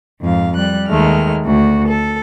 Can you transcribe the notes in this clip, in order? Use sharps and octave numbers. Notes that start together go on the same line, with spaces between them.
F2 G#2 F5
G3 F#6
D#2 D#3 G#3 A3 F6
D2 F#4
A4